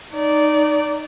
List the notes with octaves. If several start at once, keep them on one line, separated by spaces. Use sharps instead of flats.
D#4 D5